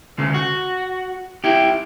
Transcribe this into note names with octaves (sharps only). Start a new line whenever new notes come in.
D2 C#3
F#4
E4 G4